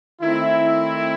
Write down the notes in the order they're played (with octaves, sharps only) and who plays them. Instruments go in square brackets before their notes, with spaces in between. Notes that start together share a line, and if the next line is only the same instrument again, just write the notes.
[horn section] D#3 A3 C4 E4